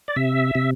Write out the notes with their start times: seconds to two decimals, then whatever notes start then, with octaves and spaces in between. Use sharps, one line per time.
0.08 D5
0.16 C3 E5
0.55 C3